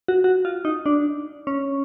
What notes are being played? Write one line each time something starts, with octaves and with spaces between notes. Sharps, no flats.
F#4
F#4
F4
D#4
D4
C#4